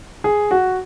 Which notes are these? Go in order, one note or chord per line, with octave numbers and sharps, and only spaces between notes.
G#4
F#4